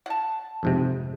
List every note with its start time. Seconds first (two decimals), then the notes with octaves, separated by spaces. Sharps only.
0.06 F#5 A5
0.63 F2 G#2 C3